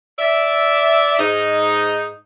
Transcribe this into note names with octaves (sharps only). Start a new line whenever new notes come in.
D5 E5
G#2 D#4